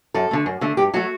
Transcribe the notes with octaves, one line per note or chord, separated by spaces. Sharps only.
F#2 A4
D3 A3
F#2
D3 A3
G2 G4
F#3 A3 F#4